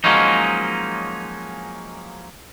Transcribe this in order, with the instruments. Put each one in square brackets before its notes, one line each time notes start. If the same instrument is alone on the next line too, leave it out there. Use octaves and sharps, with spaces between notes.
[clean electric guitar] F3 F#3 G#3 A#3 C#4 D#4